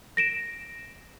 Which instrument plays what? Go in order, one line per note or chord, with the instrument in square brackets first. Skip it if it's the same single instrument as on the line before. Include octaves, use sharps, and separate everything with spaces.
[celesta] A#6 D7 E7